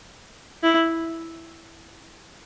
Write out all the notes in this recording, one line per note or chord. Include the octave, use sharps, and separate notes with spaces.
E4